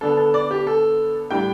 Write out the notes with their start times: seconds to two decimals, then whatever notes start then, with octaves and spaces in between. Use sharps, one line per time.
0.01 D3 B3 D4 A4
0.17 A4
0.34 D5
0.51 G4
0.67 A4
1.31 A2 G3 D4 G5